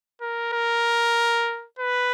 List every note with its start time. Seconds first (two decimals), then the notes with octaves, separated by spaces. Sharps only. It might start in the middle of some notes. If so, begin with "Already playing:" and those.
0.21 A#4
0.53 A#4
1.79 B4